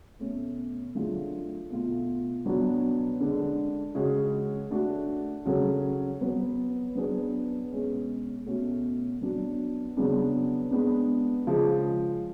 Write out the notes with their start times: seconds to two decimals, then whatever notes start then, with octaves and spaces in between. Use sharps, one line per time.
0.19 B2 A3 C#4
0.95 D3 F#3 A3 F4 G#4
1.70 B2 A3 F4
2.45 B2 F#3 B3 D4 F#4
3.20 D3 G#3 D4
3.95 C#3 G#3 C#4 F#4
4.71 A3 D4 F#4
5.46 C#3 F#3 C#4 F#4 A4
6.21 F#3 B3 F#4 B4
6.95 F#3 B3 D4 G#4 B4
7.71 B2 G#3 C#4
8.46 B2 A3 C#4 F#4
9.21 F#3 B3 D4 F#4
9.97 C#3 F#3 B3 D4 G#4
10.71 G#3 B3 D4
11.47 C#3 F3 G#3